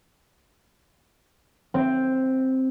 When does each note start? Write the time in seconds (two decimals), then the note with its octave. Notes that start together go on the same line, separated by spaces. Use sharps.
1.74 C4